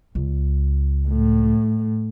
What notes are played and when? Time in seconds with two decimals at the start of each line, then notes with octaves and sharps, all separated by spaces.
0.15 C#2
1.09 A2